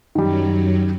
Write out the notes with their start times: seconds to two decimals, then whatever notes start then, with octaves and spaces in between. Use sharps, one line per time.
0.15 F#2 D#3 F#3 G3